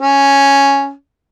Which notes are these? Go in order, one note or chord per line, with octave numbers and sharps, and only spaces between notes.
C#4